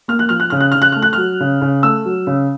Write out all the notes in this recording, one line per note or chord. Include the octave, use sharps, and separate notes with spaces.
A#3 F6
F#6
F3 F6
F#6
C#3 F6
F#6
C#3 F6
F#6
A3 F6
F#6
F#3 F6
C#3
C#3
A3 E6
F#3
C#3